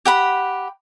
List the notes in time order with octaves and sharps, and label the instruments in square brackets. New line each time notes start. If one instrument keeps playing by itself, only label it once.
[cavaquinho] G4 F#5 B5